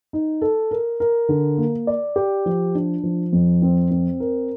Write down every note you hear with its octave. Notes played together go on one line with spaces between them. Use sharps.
D#4
A4
A#4
A#4
D3
A#3
D5
G4
F3
D4
F3
F2
C4
C4
A#4